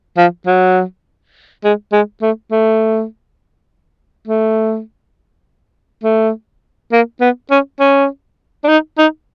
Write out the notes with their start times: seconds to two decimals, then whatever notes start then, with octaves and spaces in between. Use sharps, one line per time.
0.17 F3
0.46 F#3
1.64 G#3
1.93 G#3
2.22 A3
2.52 A3
4.27 A3
6.04 A3
6.92 A#3
7.21 B3
7.51 C#4
7.80 C#4
8.64 D4
8.68 D#4
8.98 D#4